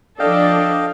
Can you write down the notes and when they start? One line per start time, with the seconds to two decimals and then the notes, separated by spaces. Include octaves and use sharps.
0.19 F3 D4 A4 D5 D#5 F5 G5